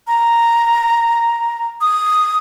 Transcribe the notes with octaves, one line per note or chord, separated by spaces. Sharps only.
A#5
D#6